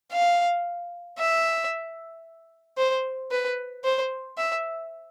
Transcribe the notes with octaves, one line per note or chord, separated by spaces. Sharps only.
F5
E5
C5
B4
C5
E5